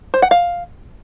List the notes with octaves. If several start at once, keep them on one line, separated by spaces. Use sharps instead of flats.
C5
F#5
F5